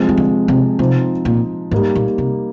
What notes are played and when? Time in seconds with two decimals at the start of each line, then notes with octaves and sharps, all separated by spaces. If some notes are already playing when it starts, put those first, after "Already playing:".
Already playing: C3 F3 G#3
0.09 D#3
0.17 D3
0.48 C3
0.79 C3 F3 C4 D#4
1.25 A#2
1.71 G#2 G3 A#3 D#4
1.95 A#2
2.18 C3